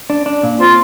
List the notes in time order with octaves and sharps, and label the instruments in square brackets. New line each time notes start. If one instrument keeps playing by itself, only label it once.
[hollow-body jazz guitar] D4
D4
A#2
[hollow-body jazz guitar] C4 [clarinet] F4